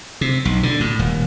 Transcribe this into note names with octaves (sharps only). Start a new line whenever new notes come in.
C3
B1
D3
A2
D#1